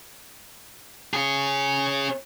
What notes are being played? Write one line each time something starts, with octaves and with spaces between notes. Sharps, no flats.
C#4 G#4